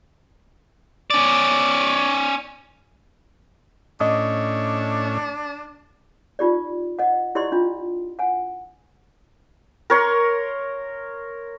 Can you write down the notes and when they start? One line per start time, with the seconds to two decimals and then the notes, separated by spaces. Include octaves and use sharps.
1.10 C#4 D5
4.00 A2 C#4 D4 D#5 D#6
6.39 D#4 F4 G4 D5
6.99 D#5 F#5
7.35 E4 G4 D5 D#5 C6
7.52 D4 F4
8.19 F#5 G#5
9.90 A#4 C#5 C6